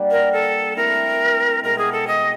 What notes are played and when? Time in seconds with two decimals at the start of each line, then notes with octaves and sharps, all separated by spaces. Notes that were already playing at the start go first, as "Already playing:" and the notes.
Already playing: G3 A#3 D4 F#4
0.11 A#4
0.33 A4
0.77 A3 C4 E4 A#4
1.63 B2 G#3 C4 A#4
1.78 G#4
1.92 A4
2.08 D#5